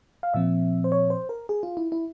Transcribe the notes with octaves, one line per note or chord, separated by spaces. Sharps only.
F5
A#2 F3 C4 E5
C5
C#5
C5
A#4
G#4
F4
E4
E4